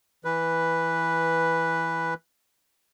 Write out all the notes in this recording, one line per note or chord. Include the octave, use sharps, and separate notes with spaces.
E3 B4